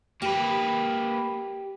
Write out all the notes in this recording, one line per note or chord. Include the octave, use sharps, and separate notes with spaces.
A#3 G4 B4